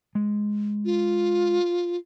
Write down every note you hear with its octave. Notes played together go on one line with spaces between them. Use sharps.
G#3
F4